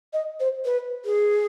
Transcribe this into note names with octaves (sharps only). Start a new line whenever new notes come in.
D#5
C5
B4
G#4